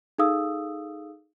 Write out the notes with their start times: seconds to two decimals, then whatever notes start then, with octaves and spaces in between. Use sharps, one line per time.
0.18 D#4 G#4 A4 F5 D#6 E6